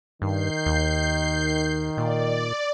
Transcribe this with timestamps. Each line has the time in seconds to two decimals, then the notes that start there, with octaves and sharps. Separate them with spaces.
0.22 G2 D#3 G6 C7
0.66 D#2
1.97 A#2 D5